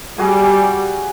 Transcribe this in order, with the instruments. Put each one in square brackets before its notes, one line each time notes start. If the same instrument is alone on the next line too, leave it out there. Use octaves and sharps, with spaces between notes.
[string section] G3 [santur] F#4 G#4 G#5